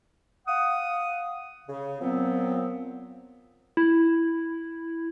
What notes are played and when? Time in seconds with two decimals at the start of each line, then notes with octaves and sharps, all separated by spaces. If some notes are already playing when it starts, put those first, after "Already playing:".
0.47 F5 F#5 D#6
1.68 C#3
2.00 A#2 F3 F#3 B3 C4
3.77 E4